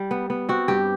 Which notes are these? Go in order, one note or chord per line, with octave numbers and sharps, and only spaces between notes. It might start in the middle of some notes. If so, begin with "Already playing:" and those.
Already playing: G3
B3
B3
C4 F#4
G2 G4